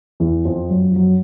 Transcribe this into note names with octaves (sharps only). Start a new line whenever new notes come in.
E2 E3
F2 F3
F#2 F#3
F3
F#2 F#3